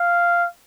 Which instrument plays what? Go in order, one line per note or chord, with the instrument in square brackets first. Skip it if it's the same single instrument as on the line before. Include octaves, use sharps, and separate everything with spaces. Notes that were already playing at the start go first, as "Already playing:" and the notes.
Already playing: [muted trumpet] F5